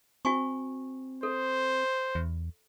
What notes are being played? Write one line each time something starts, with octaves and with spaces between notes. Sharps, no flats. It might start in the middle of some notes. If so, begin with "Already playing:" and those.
C4 F#4 G#5 C#6
A4 C5
E2